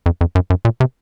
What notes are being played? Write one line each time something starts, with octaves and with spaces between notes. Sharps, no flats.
F2
F2
F#2
F#2
A#2
C3